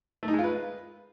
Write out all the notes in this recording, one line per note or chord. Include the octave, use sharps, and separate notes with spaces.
A3
D#4
G#3
F4
B4